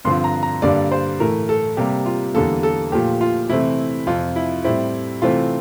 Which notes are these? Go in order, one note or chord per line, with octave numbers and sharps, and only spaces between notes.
G2 D3 F3 C4 C6
A#5
A#5
G2 D3 G3 A#3 D5
C5
A2 E3 A3 A#4
A4
C3 G3 A#3 G4
F4
E2 D3 G3 A#3 A4
A4
A#2 F3 A3 G4
F4
C3 E3 A3 C4 E4
F2 C3 F3 F4
E4
A2 G3 C4 E4
C3 E3 A3 C4 F4